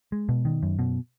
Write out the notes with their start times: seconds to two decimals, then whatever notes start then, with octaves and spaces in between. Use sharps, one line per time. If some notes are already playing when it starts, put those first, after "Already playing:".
0.12 G#3
0.29 B2
0.45 D#3
0.63 F#2
0.79 B2